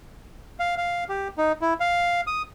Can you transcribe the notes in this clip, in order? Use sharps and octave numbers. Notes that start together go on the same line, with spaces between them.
F5
F5
G4
D#4
E4
F5
D#6